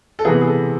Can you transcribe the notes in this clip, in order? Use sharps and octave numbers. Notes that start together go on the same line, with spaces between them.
A4
C3 E3 B3 G#4
G#4
A4